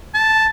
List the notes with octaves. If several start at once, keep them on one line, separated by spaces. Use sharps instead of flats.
A5